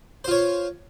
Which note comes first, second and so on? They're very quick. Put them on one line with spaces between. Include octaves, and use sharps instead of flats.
C5 F4 C#5